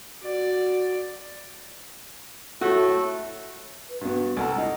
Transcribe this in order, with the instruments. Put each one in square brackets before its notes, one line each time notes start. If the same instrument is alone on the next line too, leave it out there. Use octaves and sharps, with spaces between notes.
[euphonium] F#4 [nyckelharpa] D5
[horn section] A2 A3 [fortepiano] F#4
[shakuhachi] B4
[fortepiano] G2 B3 [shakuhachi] F#4
[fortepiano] C2 A4 A#5 [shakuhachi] F#5
[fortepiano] D#4